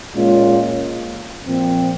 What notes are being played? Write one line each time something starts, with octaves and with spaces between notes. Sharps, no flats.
A#2 G#3 C#4 F4
A#2 F3 C4